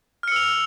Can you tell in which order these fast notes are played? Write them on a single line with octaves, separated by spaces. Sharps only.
F6 C#7 E6 F7